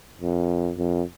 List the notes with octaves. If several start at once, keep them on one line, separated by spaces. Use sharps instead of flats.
F2
F2